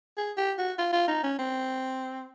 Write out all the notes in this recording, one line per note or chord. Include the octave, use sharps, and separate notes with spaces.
G#4
G4
F#4
F4
F4
D#4
C#4
C4